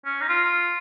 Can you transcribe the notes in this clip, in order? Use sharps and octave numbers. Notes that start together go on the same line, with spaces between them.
C#4
D#4
F4